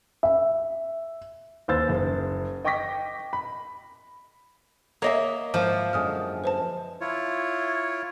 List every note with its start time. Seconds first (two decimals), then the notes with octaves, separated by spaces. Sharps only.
0.23 E5
1.68 D#2 B4 C5 E6 A6
1.89 F#1
2.65 D#5 G5 C#6 D6 A#6 B6
3.33 B5
5.02 A#3 C#5 D#5 E5
5.54 G#2 F3 E4 F5
5.93 F#2 D3 G#3 G#5 D#6 F6
6.44 B4 C5 A5
7.01 E4 F4 C#5